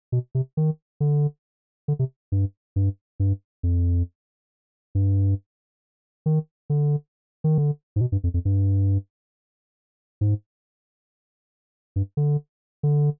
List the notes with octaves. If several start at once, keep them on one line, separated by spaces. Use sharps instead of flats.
B2
C3
D#3
D3
D3
C3
G2
G2
G2
F2
G2
D#3
D3
D#3
D3
G#2
B2
G2
F2
F2
G2
G#2
G2
D3
D3